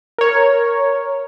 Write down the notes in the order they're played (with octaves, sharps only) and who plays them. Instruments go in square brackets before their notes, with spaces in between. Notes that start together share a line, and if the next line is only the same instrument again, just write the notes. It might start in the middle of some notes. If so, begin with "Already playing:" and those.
[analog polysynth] A#4 C#5